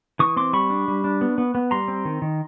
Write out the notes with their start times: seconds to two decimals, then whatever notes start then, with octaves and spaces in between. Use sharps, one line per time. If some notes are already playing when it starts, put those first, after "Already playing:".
0.19 E3 C#6 D#6
0.37 C4 C6 D6
0.53 G3 B5 C#6
0.70 D4
0.88 G3
1.04 D4
1.21 B3
1.38 B3
1.55 B3
1.71 G3 A#5 C6
1.88 C4
2.05 D#3
2.22 D#3